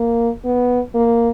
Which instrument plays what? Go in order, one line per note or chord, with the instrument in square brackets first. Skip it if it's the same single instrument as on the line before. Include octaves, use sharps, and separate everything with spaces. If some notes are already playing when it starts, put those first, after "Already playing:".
Already playing: [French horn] A#3
B3
A#3